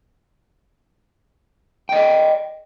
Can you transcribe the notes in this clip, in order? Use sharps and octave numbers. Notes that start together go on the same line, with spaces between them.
D5 D#5 G5